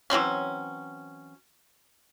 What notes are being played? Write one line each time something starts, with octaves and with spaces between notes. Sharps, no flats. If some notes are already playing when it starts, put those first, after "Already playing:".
E3 F#3 C4 C#4